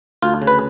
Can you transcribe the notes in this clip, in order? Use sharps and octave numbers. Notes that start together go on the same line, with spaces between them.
D2 F4
C#3
B4